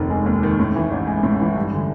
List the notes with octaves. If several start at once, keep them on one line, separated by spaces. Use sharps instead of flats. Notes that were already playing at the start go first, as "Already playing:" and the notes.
Already playing: F1 D#2 D#3
G#3
D#2
D#3
A2
E3
A1
G#3
A2
E3
G2
D3